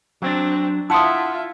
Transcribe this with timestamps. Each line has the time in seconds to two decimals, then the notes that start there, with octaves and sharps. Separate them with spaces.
0.22 F#3 C4 D4
0.90 E4 F4 E5 F#5 A5 C6 D#6